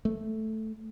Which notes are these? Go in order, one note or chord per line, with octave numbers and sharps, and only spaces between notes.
A3